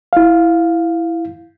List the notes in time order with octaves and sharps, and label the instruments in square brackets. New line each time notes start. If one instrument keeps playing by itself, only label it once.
[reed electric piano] E4 F5